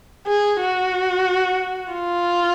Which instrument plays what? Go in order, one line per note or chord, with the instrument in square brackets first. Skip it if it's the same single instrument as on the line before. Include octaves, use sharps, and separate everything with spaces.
[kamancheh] G#4
F#4
F4